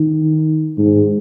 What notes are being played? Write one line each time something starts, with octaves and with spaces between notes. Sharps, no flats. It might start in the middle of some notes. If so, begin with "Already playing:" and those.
Already playing: D#3
G#2